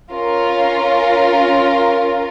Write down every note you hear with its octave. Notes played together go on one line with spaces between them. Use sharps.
C#4 F4 A#4